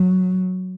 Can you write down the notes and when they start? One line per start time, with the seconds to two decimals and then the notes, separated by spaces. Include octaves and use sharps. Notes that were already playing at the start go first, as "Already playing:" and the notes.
Already playing: F#3